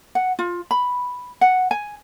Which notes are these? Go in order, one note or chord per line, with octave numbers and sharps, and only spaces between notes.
F#5
F4
B5
F#5
G#5